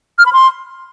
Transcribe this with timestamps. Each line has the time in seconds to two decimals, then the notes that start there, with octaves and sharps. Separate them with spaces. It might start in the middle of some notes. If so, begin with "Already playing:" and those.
0.19 F6
0.26 B5
0.33 C6